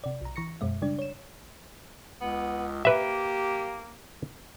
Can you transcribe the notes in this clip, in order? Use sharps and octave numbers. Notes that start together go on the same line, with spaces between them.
C3 D5
B1 A#5
E3 C#6 A#6 C#7
F#2 B2 G#3 E5
C#3 G3 G#3 D4 D5
C#5 E7
C#2 B3
A#3 G4 B4 E5